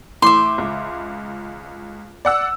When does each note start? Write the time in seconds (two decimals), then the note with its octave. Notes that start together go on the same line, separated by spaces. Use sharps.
0.22 A2 E3 E5 C6 D6
0.58 C#2
2.25 D5 F#5 E6